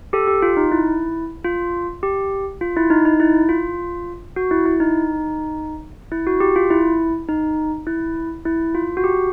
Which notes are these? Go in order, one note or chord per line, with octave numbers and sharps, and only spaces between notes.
G4 A4
G4
F4
D#4
E4
F4
G4
F4
E4
D#4
D#4
E4
F4
F#4
E4
E4
D#4
E4
F#4
G4
F4
E4
D#4
E4
E4
F4
F#4
G4